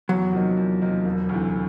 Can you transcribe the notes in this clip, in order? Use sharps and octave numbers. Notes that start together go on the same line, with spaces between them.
E2 F#3
C3 F3 A#3 D#4
E2
C3 F3 A#3 D#4
E1
D2 C3 E3